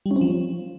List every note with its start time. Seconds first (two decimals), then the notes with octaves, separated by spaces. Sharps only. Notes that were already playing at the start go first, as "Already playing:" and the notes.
0.06 G3
0.11 C#4
0.16 C4
0.21 F3